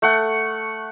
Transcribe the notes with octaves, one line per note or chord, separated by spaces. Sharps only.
A3 F#5